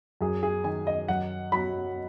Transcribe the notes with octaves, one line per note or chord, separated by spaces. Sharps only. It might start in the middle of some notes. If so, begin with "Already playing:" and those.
F#2 G#4
G#4
D#3 G#5
D#5
F#2 F#5
F#3 B5